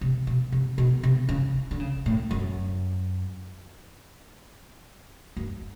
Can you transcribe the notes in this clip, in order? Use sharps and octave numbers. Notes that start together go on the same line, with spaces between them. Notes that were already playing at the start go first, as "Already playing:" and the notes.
C3
B2
C3
B2
C3
C#3
D3
C#3
A2
F#2
F#2